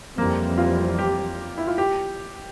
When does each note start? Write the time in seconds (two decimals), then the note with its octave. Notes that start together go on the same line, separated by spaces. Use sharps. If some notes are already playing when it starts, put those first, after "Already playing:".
0.18 F2 E3 G3 A#3 C4
0.58 F4
0.98 G4
1.58 E4
1.68 F4
1.78 G4